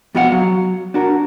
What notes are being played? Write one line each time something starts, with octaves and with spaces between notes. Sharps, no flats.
F2 B3 F#4 D#5 F5 F#5
F#3
D4 F#4 A#4